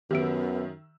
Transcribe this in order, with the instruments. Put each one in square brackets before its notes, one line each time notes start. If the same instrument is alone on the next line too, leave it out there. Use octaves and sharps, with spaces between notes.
[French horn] F#2 [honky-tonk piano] D#3 E5 E6 [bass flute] B3 [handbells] G4 D7